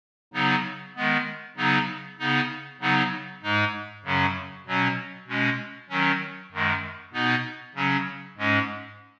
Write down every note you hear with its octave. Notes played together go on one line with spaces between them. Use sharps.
C#3 F#3 B3 D#4
D#3 G#3 B3
C#3 F#3 B3 D#4
C#3 B3 D#4
C#3 F#3 B3 D#4
G#2 G#3 D#4
F#2 C#3 F#3 C#4
B2 F#3 C#4
B2 G#3 C#4
D#3 F#3 C#4
F#2 D#3 G#3
B2 B3 D#4
C#3 F#3 C#4
G#2 G#3 C#4